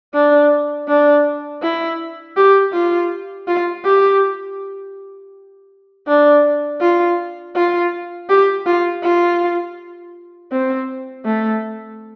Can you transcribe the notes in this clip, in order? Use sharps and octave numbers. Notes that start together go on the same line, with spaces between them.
D4
D4
E4
G4
F4
F4
G4
D4
F4
F4
G4
F4
F4
C4
A3